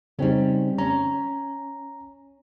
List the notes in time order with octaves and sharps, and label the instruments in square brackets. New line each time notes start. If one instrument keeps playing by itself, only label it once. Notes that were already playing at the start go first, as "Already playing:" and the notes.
[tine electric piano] C#3 C4 D#4 [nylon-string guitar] G3 C#4
[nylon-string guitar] C#4 [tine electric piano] A#5